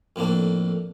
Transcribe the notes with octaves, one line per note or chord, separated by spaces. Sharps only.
F2 A2 A#3 D4